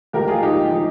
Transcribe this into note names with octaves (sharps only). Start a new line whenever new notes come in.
A#1 G#2 F3 G4 A#4
F4 G#4
D#4 G4
F3 D#4